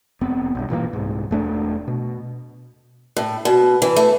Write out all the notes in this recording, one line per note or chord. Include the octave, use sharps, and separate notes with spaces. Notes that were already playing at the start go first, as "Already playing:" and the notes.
F1 B3 C4
B1 G2
A#2 E3 G#3 A#3
C2 G#2
E1 A3 D4
B2
A2
B2
E3
A3